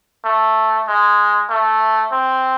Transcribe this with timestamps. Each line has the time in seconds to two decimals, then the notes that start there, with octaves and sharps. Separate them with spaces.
0.25 A3
0.87 G#3
1.50 A3
2.12 C4